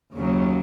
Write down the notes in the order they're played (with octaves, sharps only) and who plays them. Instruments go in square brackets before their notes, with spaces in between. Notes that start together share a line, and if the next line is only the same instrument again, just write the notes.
[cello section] D#2 C#3 F#3